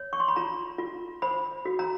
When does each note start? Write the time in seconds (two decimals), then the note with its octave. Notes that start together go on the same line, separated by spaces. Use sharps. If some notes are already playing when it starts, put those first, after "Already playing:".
Already playing: C#5
0.13 C#6
0.20 C6
0.28 B5
0.36 F4 A#5
0.78 F4
1.22 C5 B5
1.65 F#4
1.79 A#5